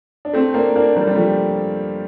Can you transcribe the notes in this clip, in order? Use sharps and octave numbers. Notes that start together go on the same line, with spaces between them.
D4
A3 C4
A#3 D4
A#3 D4
G3 A#3
G3
F3 A3